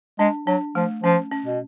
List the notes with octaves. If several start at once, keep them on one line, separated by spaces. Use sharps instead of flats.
G#3 D4
F#3 D4
F3 A3
F3 C#4
C#4
B2